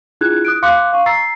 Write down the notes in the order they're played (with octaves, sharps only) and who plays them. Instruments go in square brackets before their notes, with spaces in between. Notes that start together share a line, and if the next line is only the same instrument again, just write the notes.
[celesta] D4 E4 F4 G#4 F#6 G#6
D#6 F#6 D7
F5 C6 D6 F#6 C#7
F5 C#6
A#5 E6 A6 C7